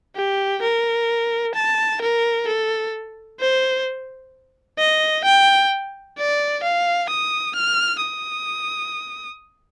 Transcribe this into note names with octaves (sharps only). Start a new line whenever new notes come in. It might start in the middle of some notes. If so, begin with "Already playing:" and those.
G4
A#4
A5
A#4
A4
C5
D#5
G5
D5
F5
D#6
F6
D#6